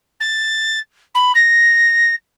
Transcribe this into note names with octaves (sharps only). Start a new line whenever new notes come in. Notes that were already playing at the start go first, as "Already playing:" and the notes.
A6
B5
A#6